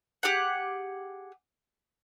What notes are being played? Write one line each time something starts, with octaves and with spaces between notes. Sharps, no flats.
G4 G#4 F#5